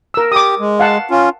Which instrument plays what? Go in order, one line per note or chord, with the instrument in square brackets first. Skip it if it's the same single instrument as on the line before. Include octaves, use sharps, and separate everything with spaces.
[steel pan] A#4 E6
[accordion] G4 [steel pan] D6 D#6
[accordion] G#3
[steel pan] F5 F#5 A5
[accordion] C#4 F4